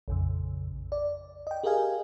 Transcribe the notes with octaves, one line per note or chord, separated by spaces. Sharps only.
A#1 F2 C#3
D5
D#5 G5
G4 G#4 A#4 D#5 F5 G#5